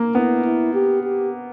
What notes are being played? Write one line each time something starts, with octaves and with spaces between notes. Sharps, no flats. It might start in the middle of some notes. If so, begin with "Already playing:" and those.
Already playing: A#3
B3 E4
E4
G4
G4